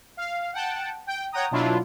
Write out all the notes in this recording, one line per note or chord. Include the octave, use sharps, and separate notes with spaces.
F5
F#5 G5 A5
G5
C#5 F#5 G5 A#5 D#6
B2 F#3 D4 E4 F4